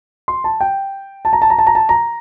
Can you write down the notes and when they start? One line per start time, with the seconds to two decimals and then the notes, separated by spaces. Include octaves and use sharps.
0.28 C6
0.44 A5
0.61 G5
1.25 A5
1.33 A#5
1.42 A5
1.50 A#5
1.58 A5
1.67 A#5
1.75 A5
1.89 A#5